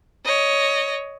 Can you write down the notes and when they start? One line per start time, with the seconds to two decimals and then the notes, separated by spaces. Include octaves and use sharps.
0.25 C#5 D#5